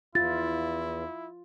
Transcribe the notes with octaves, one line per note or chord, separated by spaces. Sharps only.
E2 E4 F4 A6